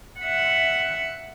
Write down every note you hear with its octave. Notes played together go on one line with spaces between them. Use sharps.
E5 F#5